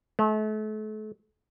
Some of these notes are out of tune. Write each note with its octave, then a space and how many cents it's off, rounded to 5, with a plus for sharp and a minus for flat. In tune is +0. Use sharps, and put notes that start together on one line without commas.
A3 -35